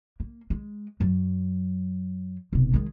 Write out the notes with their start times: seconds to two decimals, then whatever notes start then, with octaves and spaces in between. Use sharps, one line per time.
0.20 A#3
0.50 G#3
1.00 F#2 F#3
2.53 F1 B2
2.73 D#3 G#3